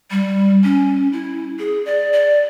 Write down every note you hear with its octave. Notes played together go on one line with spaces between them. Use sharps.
G3
C#4
E4
G#4
D5
D5